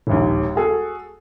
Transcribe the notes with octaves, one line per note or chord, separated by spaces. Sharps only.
E1 A#1 D#2
F#4 G#4 A4